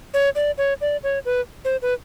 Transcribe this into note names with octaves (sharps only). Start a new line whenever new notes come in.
C#5
D5
C#5
D5
C#5
B4
C5
B4